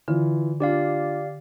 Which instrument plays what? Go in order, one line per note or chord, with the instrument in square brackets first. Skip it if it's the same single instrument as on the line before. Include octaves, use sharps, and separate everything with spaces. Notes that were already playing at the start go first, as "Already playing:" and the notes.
[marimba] D3 [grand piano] E3 F4 B4
[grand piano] D4 F4 [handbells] G4 D5 F5